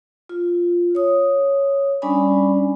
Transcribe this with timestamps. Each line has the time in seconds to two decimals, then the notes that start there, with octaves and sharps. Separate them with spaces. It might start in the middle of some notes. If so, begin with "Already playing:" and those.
0.29 F4
0.95 C#5 D#6
2.02 G3 C#4 D4 D5 G#5 B5